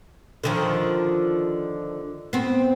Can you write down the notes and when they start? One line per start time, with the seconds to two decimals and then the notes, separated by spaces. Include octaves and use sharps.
0.43 D3 D#3 F3
2.33 B3 C4